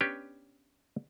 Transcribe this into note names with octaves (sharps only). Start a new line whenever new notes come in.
B3 C#4 D4 G4 B4